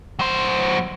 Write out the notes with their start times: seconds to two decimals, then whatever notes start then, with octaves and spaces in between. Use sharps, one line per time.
0.19 F#3 C5